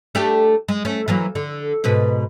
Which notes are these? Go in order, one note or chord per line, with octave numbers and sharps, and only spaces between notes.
A3 D4 G4
G#3
A3 C#4
E3 F#3 A#3
D3
G#2 B2 B4